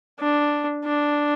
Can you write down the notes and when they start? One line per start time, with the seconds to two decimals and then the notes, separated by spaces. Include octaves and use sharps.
0.20 D4
0.85 D4